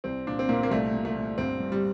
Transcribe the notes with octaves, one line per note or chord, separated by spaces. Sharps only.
C2 C4
A#2 D4
C4
A#2 A#3
A#3
C2 A3
A#2
A3
A#2
G1 C4
G2
G3